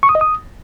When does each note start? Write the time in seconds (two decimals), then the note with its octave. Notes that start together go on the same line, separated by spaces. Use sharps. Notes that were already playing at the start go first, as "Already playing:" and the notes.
0.03 C#6
0.09 D#6
0.15 D#5
0.21 D#6